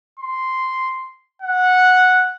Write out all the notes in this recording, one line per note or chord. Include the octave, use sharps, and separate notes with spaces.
C6
F#5